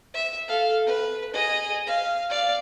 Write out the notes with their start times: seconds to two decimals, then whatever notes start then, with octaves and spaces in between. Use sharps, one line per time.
0.14 E5
0.48 A4 F5
0.86 B4
1.33 G#4 D#5
1.87 F5
2.30 D5 F5